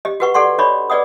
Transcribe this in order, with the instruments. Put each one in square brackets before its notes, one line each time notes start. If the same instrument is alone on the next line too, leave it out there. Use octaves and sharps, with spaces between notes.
[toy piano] G4 D#5
F#4 G4 B4 F#5 C#6
G4 A4 D5 F#5 C6 C#6
D4 C#5 D#5 B5 C#6
G#4 B4 D5 D#5 F#5 D#6